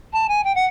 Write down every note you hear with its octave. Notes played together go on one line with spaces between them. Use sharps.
A5
G#5
G5
F#5